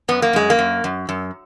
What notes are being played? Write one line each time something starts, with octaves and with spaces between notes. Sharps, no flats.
F#2 B3
A#3
F#2 G#3
A#3
F#2
F#2
F#2